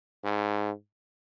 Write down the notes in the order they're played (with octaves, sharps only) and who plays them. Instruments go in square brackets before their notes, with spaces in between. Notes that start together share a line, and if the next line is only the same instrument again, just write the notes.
[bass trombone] G#2